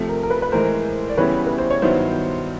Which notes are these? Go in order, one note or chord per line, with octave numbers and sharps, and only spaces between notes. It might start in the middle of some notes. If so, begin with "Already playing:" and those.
Already playing: C3 F3 A3
A#4
A#4
B4
B4
A2 E3 G#3 A#4 C5
D5
C#3 E3 G3 B3 E4 B4 C#5
B4
C5
C#5
G2 D#3 F#3 B3 E4 C5 D5